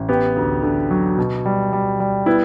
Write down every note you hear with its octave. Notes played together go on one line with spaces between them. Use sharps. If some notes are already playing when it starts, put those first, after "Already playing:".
Already playing: A1
B3 G4
D2
D3
F#3
B2
G3
G3
G3
B3 E4